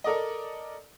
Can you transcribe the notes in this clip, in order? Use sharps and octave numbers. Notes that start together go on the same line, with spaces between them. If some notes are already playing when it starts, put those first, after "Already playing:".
A4 A#4 D5 D#5